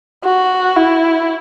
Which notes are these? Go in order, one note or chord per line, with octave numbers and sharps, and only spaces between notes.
F#4
E4